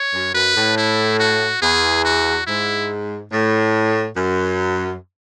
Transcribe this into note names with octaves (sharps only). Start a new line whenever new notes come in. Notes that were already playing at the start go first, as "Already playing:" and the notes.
Already playing: C#5
F#2
F#2 B4
A2
E4
F#4
E2 G#4
F#4
G#2 E4
A2
F#2